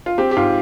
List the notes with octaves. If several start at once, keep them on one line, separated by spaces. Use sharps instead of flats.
F4
C4 G4
G4
G#2 F4